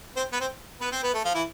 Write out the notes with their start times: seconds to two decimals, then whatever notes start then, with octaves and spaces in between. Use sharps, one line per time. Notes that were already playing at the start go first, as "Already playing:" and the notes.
0.16 C4 C5
0.33 B3 B4
0.40 C4 C5
0.81 B3 B4
0.92 C4 C5
1.03 B3 B4
1.14 A3 A4
1.25 F3 F4
1.35 E3 E4